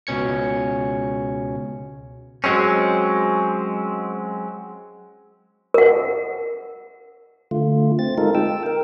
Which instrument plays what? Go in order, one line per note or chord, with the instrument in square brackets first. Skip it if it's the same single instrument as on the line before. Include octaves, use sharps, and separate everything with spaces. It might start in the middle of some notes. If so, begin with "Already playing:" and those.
[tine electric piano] C#2 B2 C#4 G#6 C#7
[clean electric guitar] F#3 G#3 C4 C#4
[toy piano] A#4 F#5
[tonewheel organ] D3 A3 F4
C4 A6
G#3 D#4 F4 A4 A#4
G5 E6
A#4